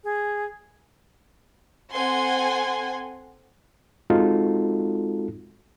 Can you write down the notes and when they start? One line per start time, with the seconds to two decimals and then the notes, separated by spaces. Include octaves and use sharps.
0.04 G#4
1.92 C4 A4 F#5 G#5 C6
4.10 G#3 C4 D#4 F4 F#4 A4